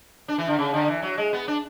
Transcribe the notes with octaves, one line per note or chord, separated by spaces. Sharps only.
D4
E3
D3
C#3
D3
E3
F#3
G#3
B3
D4